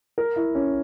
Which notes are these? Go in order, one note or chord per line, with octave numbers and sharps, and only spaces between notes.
A#4
E4
C#4